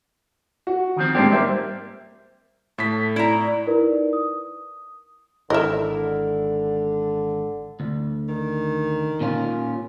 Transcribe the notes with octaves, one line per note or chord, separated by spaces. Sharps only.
F#4
D#3 F3 C4
G#2 A#3 C4 D4 G4
G3 A#3 A#4 C5 E5
A2 A4 B6
E4 D5 A#5
D#4 E4 A#4 B4 D5
D#6
G#1 D3 E4 A#4 D#5 E5
D2
D#3
A#2 C#4 F4